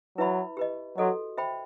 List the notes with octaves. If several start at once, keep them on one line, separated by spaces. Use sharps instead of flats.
F#3 E4 B4 E5 B5
G4 B4 D#5
F#3 F#4 A4 D#5
C5 E5 G5 B5